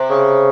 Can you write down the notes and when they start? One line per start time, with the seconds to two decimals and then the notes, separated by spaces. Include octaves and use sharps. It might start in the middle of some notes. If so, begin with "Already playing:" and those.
Already playing: C3
0.10 C#3